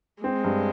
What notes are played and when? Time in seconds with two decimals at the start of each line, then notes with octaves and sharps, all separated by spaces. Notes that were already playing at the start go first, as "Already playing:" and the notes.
0.23 G#3 C4
0.44 G2